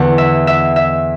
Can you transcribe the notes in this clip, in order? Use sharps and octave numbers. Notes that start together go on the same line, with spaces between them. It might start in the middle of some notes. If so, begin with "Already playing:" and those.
Already playing: E2 D3 F#5
E5
E5
E5